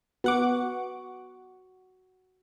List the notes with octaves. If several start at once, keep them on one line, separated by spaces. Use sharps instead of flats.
B3 F#4 F#5 D6